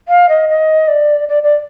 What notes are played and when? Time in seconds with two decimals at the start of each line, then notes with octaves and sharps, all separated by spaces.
0.08 F5
0.29 D#5
0.49 D#5
0.88 D5
1.29 D5
1.43 D5